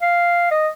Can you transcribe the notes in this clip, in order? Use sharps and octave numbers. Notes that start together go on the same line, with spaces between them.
F5
D#5